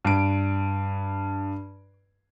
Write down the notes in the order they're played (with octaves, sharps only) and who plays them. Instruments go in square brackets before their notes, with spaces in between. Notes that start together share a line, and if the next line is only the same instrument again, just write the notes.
[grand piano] G2 D7